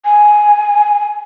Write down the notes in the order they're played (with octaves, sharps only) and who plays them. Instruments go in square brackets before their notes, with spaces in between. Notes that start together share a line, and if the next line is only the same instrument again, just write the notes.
[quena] G#5